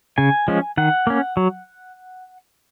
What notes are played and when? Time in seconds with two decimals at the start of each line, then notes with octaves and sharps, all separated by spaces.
0.18 C#3 G#5
0.48 F3 G#3 C#4
0.77 D#3 F#5
1.07 A#3 C#4
1.37 F#3